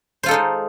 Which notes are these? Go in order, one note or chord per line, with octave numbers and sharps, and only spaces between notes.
G#3 D#4 F4 A4 C5